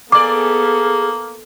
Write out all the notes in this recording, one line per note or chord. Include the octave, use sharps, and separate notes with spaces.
A#3 B3 G#4 A4 D5 D6